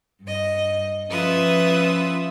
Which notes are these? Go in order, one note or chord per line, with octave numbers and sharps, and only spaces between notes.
G2 D#5
F3 C#4 F4 B4 E5 D#6